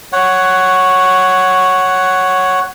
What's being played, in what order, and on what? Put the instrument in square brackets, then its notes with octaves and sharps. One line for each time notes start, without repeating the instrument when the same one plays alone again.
[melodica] C#5 F#5